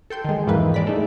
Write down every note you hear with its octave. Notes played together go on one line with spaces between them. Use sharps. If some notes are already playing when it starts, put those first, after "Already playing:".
A4 G5 C6 G6
D#3 G#3
F2 G#2 D#3 E3 A#3 B4
G#3 D5 B6
A3 D#4